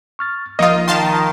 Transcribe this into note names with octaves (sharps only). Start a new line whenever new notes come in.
C#6 F6 A6
A1 F3 A#3 D#4 F4 D#5 D#6
D#3 F5 A5 C6